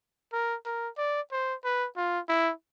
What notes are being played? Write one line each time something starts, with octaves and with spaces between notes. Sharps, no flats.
A#4
A#4
D5
C5
B4
F4
E4